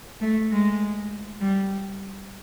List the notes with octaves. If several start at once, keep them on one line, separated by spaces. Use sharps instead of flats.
A3
G#3
G3